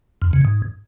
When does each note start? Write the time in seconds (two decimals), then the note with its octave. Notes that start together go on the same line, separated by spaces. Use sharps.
0.22 F2
0.33 C#3
0.45 G#2